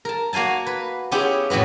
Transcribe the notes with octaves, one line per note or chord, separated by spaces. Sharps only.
A#4 A5
A#3 F#4 F5 G#5 A5
B4
B3 C#4 E4 F4 G4 G#4
F2 A2 C#4 F#4 B4